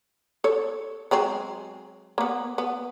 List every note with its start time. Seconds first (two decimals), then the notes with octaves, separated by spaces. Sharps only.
0.44 A4 C#5
1.11 F#3 G#3 C4
2.18 A#3 B3
2.58 B3